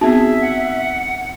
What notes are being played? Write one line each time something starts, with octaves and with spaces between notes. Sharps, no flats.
B3 C4 D#4 F#4 G#4 E5
F#5